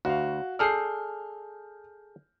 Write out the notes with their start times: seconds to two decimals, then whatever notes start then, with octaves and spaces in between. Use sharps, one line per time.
0.05 D2 F#4 F5
0.59 G#4 A4 D5 F6 G6 C7